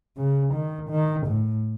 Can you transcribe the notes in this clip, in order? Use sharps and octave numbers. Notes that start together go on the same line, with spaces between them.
C#3
D#3
D#3
A2